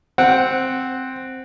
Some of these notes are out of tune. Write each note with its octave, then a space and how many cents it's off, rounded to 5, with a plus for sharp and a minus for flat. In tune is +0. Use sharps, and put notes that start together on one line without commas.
C4 +0 F#5 +0